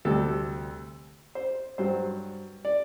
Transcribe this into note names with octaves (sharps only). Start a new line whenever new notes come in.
D2 C3 G3 A4
C5
G2 F#3 C5
D5